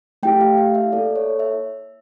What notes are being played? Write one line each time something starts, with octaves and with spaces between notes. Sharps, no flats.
A3 E4 G4 G5
F5
F5
E5
A#3 E4 A4 D5
C#5
E5